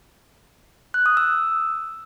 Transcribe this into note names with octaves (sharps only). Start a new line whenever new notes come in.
F#6
D#6
E6